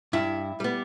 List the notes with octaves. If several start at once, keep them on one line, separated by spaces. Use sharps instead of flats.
G2 E4
G3 B3